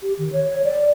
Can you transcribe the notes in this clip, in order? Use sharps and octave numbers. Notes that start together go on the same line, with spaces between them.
G4
D#3
C#5
D5